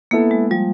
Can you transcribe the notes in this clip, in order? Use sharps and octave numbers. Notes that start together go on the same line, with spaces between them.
A#3 B3 E4 A4
G#3
F3 G3